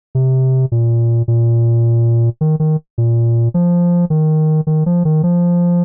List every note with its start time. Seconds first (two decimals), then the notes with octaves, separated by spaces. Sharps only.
0.15 C3
0.72 A#2
1.28 A#2
2.41 D#3
2.60 D#3
2.98 A#2
3.54 F3
4.10 D#3
4.67 D#3
4.86 F3
5.05 D#3
5.23 F3